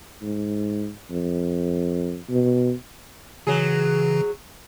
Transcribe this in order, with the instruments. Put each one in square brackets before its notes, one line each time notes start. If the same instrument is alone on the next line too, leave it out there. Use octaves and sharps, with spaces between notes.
[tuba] G#2
F2
B2
[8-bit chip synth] C#3 E3 [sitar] F#3 G#4